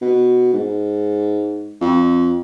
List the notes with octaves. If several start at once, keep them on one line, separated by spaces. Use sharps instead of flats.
B2
G#2
F2